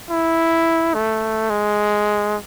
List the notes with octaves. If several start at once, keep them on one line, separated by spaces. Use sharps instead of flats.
E4
A3
G#3